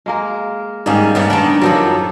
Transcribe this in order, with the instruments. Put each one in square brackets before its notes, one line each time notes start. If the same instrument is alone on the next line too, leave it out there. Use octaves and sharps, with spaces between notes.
[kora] G#3 A#3 A#4
[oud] G#2 G3 G#4 [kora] D#3 A#3 C#4
[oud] G2 B3 D#4 [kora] G3 C#4
[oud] D#3 B3 D4
[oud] F#2 D#3 F3 [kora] F#3 G4 A4